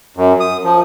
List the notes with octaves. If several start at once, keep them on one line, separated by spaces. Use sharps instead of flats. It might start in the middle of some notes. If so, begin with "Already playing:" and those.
F#2
D#6
F3